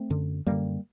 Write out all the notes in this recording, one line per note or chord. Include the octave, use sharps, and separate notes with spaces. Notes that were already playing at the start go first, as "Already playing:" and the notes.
Already playing: A3 C4
F#2 D3
F#2 D3 G3 A#3